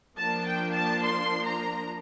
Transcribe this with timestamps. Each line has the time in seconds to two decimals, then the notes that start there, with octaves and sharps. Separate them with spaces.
0.17 F3 A#3 D4 A5
0.46 G5
0.73 A5
1.02 C6
1.44 A#5